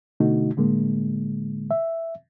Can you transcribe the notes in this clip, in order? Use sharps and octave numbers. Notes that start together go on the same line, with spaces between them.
B2 D3 A3 D#4 F#4
A2 D3 G#3 A#3
E5